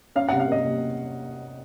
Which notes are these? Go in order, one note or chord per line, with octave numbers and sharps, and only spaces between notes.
C#4 F5
F#5
C3
F5
A#3 D#5
C3